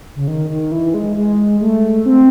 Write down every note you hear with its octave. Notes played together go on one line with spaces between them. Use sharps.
C#3
D#3
D#3
E3
G#3
G#3
A3
C4